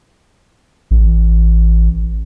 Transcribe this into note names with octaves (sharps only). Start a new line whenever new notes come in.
A1